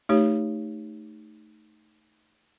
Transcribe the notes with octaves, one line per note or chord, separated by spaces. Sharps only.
A3 D#4 G4 C#5